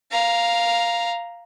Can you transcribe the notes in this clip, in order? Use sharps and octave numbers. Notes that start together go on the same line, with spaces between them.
F5 A#5